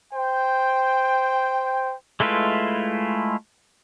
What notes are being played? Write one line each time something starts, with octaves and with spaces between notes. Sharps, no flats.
C5 G5
G#3 A3 E4 F4 B4